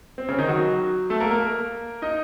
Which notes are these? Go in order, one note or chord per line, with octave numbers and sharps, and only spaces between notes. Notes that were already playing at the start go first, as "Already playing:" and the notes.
C4
C#3 C#4
D#3 D#4
F#3 F#4
A3 A4
A#3 A#4
A#3 A#4
D#4 D#5